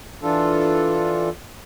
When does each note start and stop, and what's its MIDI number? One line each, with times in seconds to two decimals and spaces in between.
0.23 1.29 52
0.23 1.29 62
0.23 1.29 65
0.23 1.29 69